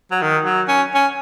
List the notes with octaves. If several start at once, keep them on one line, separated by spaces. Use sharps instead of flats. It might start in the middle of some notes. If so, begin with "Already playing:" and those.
F#3
D#3
F#3
C#4
C#4